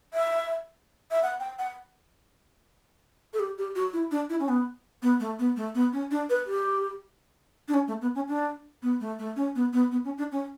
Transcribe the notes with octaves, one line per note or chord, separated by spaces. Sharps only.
E5
E5
F#5
G5
F#5
A4
G4
G4
F#4
E4
D4
E4
C#4
B3
B3
A3
B3
A3
B3
C#4
D4
B4
G4
D4
C#4
A3
B3
C#4
D4
B3
A3
A3
C#4
B3
B3
B3
C#4
D4
C#4